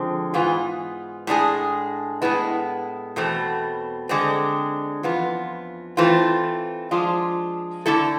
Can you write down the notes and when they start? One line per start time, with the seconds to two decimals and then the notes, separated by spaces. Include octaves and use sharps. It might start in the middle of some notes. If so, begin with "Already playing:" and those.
Already playing: D3 F3 G#3 C4
0.34 G#2 E3 B3 F4 G#4
1.27 A2 G#3 D4 G#4
2.22 A2 G#3 B3 E4
3.16 E2 B2 A3 C4
4.09 D3 G#3 C4
5.03 F2 E3 B3 F4
5.97 E3 A3 C4 F4
6.91 F3 G#3 D4 F4
7.86 D3 A3 E4 A4